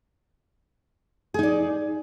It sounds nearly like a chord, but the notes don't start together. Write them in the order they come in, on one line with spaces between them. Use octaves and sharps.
G#4 D#4 D5